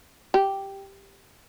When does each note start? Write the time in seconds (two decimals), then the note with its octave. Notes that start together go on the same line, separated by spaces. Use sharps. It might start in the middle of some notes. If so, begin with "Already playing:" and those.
0.34 G4